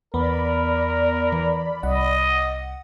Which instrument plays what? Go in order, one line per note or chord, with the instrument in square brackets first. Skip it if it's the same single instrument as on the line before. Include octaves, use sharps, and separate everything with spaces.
[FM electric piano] E2 B3 [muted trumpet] A#4 [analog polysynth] D5 B5
[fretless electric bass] E3
[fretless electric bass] C2 [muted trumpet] D#5 [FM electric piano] F#5